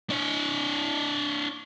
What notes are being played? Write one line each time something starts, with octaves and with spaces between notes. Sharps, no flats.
D4 C#5